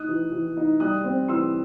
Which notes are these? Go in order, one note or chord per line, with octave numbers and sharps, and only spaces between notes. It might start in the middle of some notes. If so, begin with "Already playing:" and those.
Already playing: D#4 D#6 F#6
E3
E3
D#4
G3 D#6 F#6
C4
E3 C6 E6